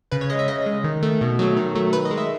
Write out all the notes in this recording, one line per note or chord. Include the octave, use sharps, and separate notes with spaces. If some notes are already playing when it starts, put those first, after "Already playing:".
C#3 B4
C#5
G#3 D#5
E5
C#3 D#5
G#3
D#3
A3
B2
F#3 A3
D#3
F#3 A3
D#3 B4
D#5
G#3
E5